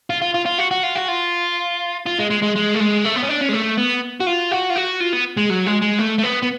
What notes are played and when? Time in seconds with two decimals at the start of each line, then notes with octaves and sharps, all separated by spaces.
0.10 F4
0.22 F4
0.34 F4
0.46 F4
0.58 F#4
0.71 F#4
0.83 F4
0.95 F#4
1.08 F4
2.06 F4
2.19 G#3
2.30 G#3
2.42 G#3
2.55 G#3
2.74 A3
2.80 G#3
3.05 A3
3.16 B3
3.23 C#4
3.29 D4
3.41 C#4
3.49 G#3
3.53 A3
3.77 B3
4.20 F#4
4.27 F4
4.51 F#4
4.70 F4
4.76 F#4
5.00 F4
5.13 B3
5.37 G#3
5.50 F#3
5.66 G#3
5.82 G#3
5.99 A3
6.18 A3
6.23 B3
6.42 B3